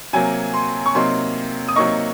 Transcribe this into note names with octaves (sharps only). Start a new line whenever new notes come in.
C3 F#3 A#3 G#5
C6
C#6
C3 F#3 A#3 D#4 C6
D#6
C3 F#3 A#3 D#4 C#6